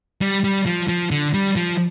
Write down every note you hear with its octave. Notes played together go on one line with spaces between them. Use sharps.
G3
G3
F3
F3
D3
G3
F3